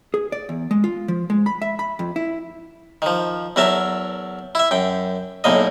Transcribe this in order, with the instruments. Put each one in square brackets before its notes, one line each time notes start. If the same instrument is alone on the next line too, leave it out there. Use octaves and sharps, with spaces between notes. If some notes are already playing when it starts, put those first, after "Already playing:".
[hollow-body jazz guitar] G#4
D5
E2
G#3
F4
F3
G#3
B5
E5
B5
F2
E4
[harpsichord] D#3 F3
E2 F#3 A#4 E5 A5
E4 E5
F#2 G5
B1 E2 A2 A#3 D#5